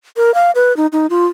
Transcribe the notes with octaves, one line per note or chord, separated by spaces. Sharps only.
A#4
F5
B4
D#4
D#4
F4